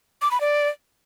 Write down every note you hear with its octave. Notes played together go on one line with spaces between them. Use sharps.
D6
B5
D5